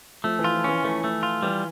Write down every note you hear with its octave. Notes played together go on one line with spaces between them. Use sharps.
F3 A3
E3
F4
F3
E3 C#4
E3 A3
A3
F4
E3 G3